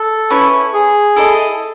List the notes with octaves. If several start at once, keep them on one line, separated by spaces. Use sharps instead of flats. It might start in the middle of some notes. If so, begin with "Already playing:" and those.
Already playing: A4
C#4 E4 B4
G#4
E4 A4 D#5